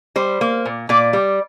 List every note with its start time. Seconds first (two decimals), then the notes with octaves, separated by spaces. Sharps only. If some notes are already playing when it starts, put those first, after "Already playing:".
0.16 G3 C5
0.41 A#3
0.65 A#2
0.89 A#2 D5
1.13 G3